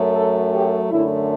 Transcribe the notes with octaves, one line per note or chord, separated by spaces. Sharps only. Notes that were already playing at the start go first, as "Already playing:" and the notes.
Already playing: F#2 F#3 A3
A4
G4
F#2 D3 A3 E4